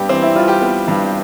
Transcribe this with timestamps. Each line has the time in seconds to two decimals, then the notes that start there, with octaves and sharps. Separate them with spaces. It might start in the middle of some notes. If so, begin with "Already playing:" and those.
Already playing: G2 B3 G4
0.09 E3 C4
0.22 E4
0.35 G3 F4
0.48 G4
0.61 B3
0.88 G2